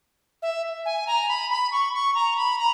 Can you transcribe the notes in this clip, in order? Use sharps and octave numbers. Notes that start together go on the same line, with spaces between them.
E5
G#5
A#5
B5
B5
C#6
C#6
A#5
B5
A#5